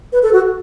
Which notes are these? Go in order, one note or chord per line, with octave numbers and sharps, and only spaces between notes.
B4
A4
F#4